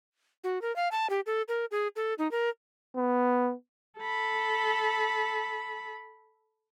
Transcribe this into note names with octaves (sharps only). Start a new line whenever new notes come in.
F#4
A#4
F5
A5
G4
A4
A#4
G#4
A4
D#4
A#4
B3
A4 B5